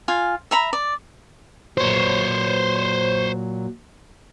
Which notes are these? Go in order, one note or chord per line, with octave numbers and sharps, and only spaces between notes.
F4 F5 G#5
E5 A#5 B5
D5
A#2 F#3 C5 C#5